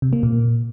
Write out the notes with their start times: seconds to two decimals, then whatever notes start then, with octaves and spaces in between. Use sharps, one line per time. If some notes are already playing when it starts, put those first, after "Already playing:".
0.02 C3
0.13 A#3
0.23 A#2